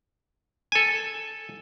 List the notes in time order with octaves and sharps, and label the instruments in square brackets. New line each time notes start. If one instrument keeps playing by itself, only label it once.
[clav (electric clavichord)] A4 G#5